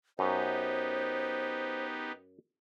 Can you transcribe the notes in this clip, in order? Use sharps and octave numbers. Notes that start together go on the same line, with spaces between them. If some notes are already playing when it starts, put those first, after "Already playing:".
F#2 B3 D#4 G4 C5